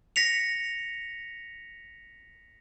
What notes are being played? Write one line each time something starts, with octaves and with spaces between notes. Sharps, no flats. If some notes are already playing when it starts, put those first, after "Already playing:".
A#6 B6 C#7 F7